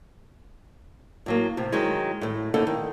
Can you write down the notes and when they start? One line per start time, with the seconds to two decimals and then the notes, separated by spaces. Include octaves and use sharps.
1.26 A2 F#3 A#3
1.57 A2 C3
1.72 D#3 F#3 G#3
2.21 A2 A4
2.54 D#2 A2 D3 D#4 A4 F#5
2.67 D#3